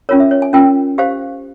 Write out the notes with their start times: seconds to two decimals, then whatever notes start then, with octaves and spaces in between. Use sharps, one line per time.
0.09 C#4 F4 A#4 C#5
0.20 E5
0.31 C#5
0.42 G#5
0.53 C#4 F4 A#4 G5
0.98 G4 C5 F5